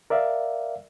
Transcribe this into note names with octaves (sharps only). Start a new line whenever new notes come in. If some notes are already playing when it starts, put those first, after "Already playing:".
A#4 D5 E5 F5